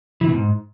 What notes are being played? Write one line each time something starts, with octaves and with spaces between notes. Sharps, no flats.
E3
B2
G#2